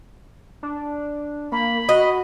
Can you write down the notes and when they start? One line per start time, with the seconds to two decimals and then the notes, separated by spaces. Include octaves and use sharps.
0.63 D4
1.52 A#3 B5
1.89 F#4 D#5